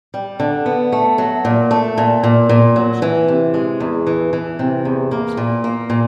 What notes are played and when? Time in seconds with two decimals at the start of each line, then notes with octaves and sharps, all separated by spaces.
0.14 G3
0.40 D3
0.66 B3
0.92 A3
1.18 F#3
1.45 A#2
1.71 A3
1.98 A#2
2.23 A#2
2.49 A#2
2.76 F#3
3.02 E3
3.28 C3
3.54 G#3
3.80 E2
4.07 E3
4.33 E3
4.59 C3
4.85 E2
5.11 A#3
5.37 A#2
5.64 A#3
5.90 A#2